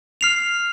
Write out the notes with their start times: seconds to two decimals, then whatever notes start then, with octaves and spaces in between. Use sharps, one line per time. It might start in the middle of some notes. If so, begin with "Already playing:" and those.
0.21 F6 C7 F7